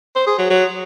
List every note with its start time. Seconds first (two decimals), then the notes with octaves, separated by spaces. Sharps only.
0.16 C5
0.27 G#4
0.39 F#3
0.50 F#3